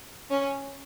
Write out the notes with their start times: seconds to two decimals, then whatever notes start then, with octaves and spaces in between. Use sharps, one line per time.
0.31 C#4